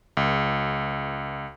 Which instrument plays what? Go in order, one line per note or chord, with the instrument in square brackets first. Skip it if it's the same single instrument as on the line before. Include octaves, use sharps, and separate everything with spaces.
[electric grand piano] C#2